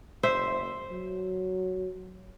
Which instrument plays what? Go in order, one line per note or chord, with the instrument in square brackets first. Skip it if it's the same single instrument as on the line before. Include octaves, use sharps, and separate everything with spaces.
[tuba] F#1 [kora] C5 E5
[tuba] F#3